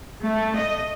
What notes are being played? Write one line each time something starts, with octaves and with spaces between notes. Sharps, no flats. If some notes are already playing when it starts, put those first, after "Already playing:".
A3
D#5